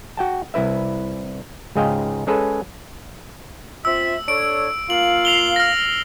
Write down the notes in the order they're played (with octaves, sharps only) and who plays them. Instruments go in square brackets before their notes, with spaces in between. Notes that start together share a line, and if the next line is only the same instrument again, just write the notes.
[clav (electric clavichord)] F#4 G5 A5
C2 E4 B4 E5
C#2 G#2 G#4 D#5 F5 G5
G#3 C#4 G#4 A4 B4
[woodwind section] C4 F4 E5 [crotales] E6
[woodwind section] D4 A4 C#5 [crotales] D7
[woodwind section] A#3 F4 F5 [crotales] F#7
[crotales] C7 F7 G7
F6 A#6